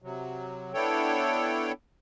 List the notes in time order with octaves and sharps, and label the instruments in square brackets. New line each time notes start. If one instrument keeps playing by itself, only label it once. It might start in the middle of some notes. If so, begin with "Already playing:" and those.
[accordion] C3 F#3
B3 D4 E4 A4 C#5 G5